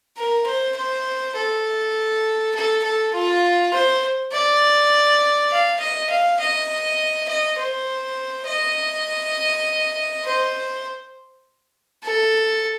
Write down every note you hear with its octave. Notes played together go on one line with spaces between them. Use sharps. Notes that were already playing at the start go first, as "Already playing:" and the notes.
A#4
C5
C5
A4
A4
A4
F4
C5
D5
F5
D#5
F5
D#5
D#5
C5
D#5
C5
A4